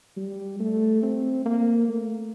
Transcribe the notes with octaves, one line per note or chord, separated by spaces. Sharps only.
G3
A3
C4
A#3
A3